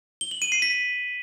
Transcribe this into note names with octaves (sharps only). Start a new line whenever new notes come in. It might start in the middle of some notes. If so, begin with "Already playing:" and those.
G7
F#7
D#7
C7
B6